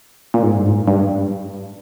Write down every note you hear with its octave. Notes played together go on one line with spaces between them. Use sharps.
A#2
G#2
G2
G#2
G2